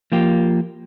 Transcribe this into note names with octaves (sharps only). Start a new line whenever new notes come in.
F3 A#3 F4 G4